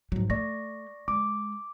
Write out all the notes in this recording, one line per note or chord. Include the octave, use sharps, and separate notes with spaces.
G#2 F#3
A3 D5 C#6 A#6
G#3 D6